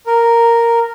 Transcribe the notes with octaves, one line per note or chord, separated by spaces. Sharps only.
A#4